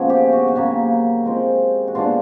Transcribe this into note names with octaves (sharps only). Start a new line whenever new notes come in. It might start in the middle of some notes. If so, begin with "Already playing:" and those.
Already playing: C#3 F3 G#3 B3 C#4
G4
F#4
F#4
C#3 F#3 A#3 G4
F3 G#3 C4
F#4
B2 G#3 B3 D4 F4